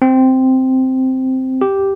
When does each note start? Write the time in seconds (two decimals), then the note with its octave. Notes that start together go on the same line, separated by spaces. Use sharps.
0.02 C4
1.61 G4